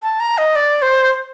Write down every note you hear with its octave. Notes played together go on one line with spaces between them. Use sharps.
A5
A#5
D#5
D5
C5